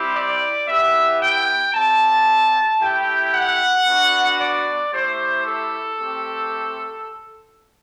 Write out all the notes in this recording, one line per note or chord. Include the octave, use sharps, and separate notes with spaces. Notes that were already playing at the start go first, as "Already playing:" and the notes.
Already playing: G3 C4 E4 G4
D5
B3 E4 G4 E5
G5
C4 G4 A5
A3 E4 G4 G5
F#5
B3 D4 F#4
D5
A3 E4 G4 C5
A4
A3 C4 G4